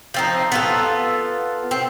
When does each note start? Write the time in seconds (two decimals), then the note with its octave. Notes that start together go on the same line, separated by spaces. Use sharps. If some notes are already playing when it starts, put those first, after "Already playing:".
0.14 F3 C4 D#4
0.52 B3 F4 A4
1.71 C4